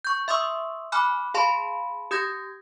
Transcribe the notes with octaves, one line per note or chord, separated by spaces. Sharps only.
C#6 G6
E5 C6 C#6 D#6 E6
G#5 B5 D6 F6 F#6
G#4 F5 A5 B5 C6
G4 D#6 G6 G#6 A#6